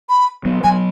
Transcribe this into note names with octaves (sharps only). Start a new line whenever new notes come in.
B5
F#3 B3
F#3 B3 G#5